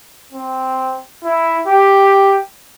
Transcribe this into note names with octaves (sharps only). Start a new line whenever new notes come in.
C4
E4
G4